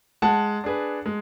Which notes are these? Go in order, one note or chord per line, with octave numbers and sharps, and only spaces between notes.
G#3 F#5 A5
D4 G#4 B4
G#3